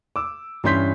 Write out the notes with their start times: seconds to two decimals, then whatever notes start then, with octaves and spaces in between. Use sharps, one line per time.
0.16 D6 E6
0.64 G2 E3 C#4 C6 G6 B6